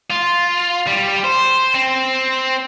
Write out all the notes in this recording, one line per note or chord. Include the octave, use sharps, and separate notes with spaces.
F4
G3
C5
C4